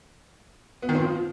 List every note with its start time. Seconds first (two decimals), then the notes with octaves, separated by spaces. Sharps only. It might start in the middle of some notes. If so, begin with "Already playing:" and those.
0.82 B3
0.89 D#3
0.95 C4
1.01 F3